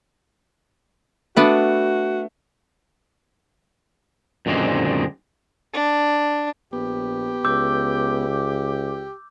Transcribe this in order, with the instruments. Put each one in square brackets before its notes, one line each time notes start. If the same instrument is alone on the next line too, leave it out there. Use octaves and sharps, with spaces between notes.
[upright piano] A3 [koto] B3 D4 B4 [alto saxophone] F#4
[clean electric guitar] F#2 A#2 D3 D#3 G#3 C4
[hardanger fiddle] D4
[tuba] A#1 [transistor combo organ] B3 [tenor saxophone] G4
[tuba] C#2 [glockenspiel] D6 E6 G6